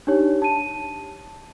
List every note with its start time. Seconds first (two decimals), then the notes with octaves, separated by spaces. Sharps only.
0.07 D4 D#4 G4 C#5
0.42 A5 D#7